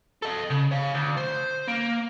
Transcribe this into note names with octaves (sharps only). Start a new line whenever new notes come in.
A4 D#5
C#3
C#5 F5
D2
C5
A#3